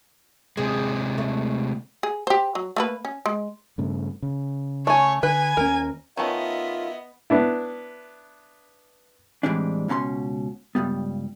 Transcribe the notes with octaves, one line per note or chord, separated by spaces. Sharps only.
C3 G#3 G#4
A3
G#4
G4 C5
F#3
A3 A#3 B4
C#4
G#3
G2 C#3 A3
C#3
A3 C#5 G#5
D3 B4 G#5
D#2 G3 C#4 A#4
D#3 A3 B3 C#4 F4 D#5 E5
B3 D4 E4
A2 E3 G3 G#3 C4 D4
C#2 B2 C#4 A#5 C6
C#2 G2 G3 B3